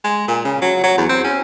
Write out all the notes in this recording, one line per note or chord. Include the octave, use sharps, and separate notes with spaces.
G#3
A#2
C#3
F#3
F#3
E2
C4
C#4